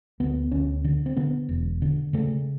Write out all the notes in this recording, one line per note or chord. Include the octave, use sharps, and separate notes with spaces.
D2 B3
D2 C#4
D3
C4
D3 B3
E1
D3
C#3 A3